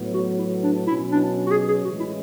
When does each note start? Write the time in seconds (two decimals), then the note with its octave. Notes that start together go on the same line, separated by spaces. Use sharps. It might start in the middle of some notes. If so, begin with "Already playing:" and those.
Already playing: A2 F#3 B3
0.14 F#4
0.38 E4
0.63 D4
0.87 B2 F#3 C#4 E4
1.11 D4
1.47 F#4
1.51 G#4
1.68 G#4
1.84 A2 E3 G#3 C#4 F#4
2.00 E4